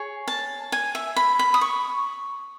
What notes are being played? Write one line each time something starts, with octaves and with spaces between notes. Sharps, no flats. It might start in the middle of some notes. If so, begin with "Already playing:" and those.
Already playing: G#4 C#5
A5
G#5
E5
B5
B5
D#6
C#6